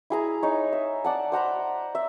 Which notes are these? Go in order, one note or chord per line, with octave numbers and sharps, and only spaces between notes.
E4 G#4 A#5
D#4 C#5
E5
D5 F#5 A5
C5 F#5 A#5 B5
E5